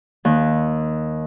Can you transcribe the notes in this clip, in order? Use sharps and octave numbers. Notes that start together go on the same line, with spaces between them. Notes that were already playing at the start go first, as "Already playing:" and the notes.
D#2